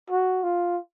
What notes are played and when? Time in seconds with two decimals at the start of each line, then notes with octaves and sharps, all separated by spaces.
0.10 F#4
0.43 F4